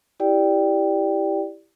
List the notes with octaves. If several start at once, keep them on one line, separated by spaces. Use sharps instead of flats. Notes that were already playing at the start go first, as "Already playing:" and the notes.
E4 G4 D5 G5